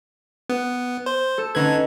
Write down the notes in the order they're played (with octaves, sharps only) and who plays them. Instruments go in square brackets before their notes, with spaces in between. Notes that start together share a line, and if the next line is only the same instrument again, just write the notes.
[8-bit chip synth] B3
C5
[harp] A4
[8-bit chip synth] D3 G#6 [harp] C#4 D#4 B4